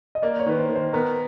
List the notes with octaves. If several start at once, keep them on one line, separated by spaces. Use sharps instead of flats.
D#5
A#3 D5
C#5
D#3 B4
C5
D#3
C5
B3 A#4